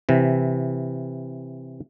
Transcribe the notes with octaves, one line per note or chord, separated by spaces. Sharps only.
C3 E3